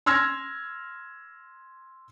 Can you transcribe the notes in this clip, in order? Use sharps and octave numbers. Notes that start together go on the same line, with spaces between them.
C6 E6 F6 G#6 A#6